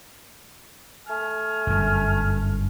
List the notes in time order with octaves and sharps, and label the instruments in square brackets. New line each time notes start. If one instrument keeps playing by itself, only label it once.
[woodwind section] A3 G#5 F6
[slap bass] G1 F#2